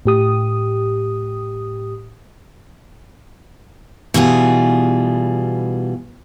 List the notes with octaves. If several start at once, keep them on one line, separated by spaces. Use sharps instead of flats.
A2 G4 D#6
B2 E3 G3 F4 F#4 G#4